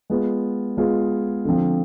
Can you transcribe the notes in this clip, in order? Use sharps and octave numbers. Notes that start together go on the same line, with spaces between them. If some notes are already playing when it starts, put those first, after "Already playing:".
G#3 B3 F4 G#4
G#3 B3 F4 G#4
D3 F3 C4